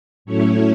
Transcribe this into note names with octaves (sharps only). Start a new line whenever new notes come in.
A2 F#3 A3 C#4 E4 C#5